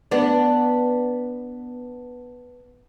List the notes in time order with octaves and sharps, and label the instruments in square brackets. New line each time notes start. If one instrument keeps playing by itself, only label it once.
[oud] B3 D4